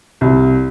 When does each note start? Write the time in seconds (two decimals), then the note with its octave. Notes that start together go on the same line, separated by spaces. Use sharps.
0.21 C2